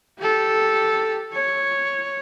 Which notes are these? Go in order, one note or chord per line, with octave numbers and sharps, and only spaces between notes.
G4 A4
C#5